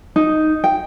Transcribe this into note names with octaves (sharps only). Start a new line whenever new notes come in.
D#4
G5